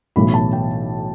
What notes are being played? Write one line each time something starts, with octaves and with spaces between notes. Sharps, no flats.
B1 A2 E3 A3 B5
A5
G5